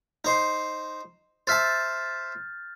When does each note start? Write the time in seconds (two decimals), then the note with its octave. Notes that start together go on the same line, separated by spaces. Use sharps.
0.25 D#4 C5 C6
1.47 C5 E5 A5 F6 G6 A6